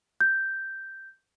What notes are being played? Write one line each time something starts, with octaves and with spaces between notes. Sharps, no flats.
G6